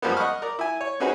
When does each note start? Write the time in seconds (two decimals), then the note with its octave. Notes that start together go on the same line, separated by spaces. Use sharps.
0.02 F#2 F3 G3 G#3 A#3 B3
0.17 D#5 F#5 B5 C#6 F6
0.42 A#4 D5
0.59 E4 G#5
0.81 C#5
1.00 C4 C#4 D#4 F#4 G#4 B4